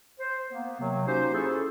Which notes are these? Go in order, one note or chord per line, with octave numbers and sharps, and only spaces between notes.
C5
A#3 B3
C3 D#3 F#3
A#3 C#4 D#4 F#4 G4 C5
C#4 E4 F4 G#4 A4